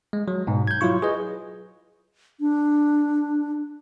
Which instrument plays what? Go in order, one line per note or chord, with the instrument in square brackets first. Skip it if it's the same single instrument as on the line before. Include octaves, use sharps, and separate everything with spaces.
[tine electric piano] G#3
F#3
G#2 B2
G6 G#6
F#3 E4 F4 C#6
G#4 B4 D#5
[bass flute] D4